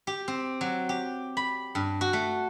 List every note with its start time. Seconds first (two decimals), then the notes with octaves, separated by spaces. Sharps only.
0.07 G4
0.28 C4
0.61 F#3
0.89 G4
1.37 B5
1.75 G2
2.01 F#4
2.13 A3